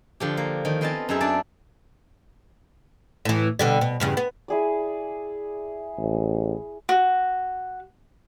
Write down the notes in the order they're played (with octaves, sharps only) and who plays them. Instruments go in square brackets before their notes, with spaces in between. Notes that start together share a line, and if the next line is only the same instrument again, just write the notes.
[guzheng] D3 F3 G4
A#3
D#3 F3
B3 C4 F4 D#5 G#5 A5
F#2 D#4 G#4 E5
D4 D5 A5
[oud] A2 E3
B2 D3 G3
B2
E2 G2 C#3
B3
[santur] E4 G#4 D5
[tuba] A1
[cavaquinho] F#4